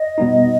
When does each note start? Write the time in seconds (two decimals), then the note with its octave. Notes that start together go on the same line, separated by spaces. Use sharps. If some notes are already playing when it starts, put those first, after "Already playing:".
Already playing: D#5
0.18 B2 G3 B3 D#4